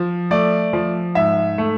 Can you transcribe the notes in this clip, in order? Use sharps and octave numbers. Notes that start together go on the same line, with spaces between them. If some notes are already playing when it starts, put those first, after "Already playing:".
Already playing: F3
A3 D5
F3
G#2 E5
A3